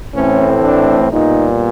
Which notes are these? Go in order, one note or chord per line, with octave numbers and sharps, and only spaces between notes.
A2 E3 A3 C4 C#4
D4
A#2 G3 B3 D#4